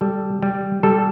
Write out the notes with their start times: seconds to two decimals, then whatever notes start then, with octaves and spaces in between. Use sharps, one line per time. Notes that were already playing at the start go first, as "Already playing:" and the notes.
0.01 G3 A4
0.42 G3 G4
0.83 G3 A4